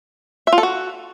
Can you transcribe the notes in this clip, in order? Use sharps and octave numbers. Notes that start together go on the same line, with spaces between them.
E5
F4
A4
F#4